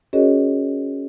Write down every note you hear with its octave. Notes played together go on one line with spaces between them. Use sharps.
C#4 F#4 G#4 A#4 C#5 D#5